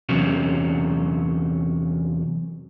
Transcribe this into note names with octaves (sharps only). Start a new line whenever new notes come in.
E2 C3 F#3 C#4